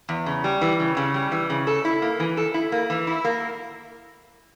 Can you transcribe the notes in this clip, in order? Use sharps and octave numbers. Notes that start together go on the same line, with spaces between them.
E2
C#3
G3
E3
C#3
C#3
G3
E3
C#3
A4
E4
A#3
E3
A4
E4
A#3
E3
E4
A#3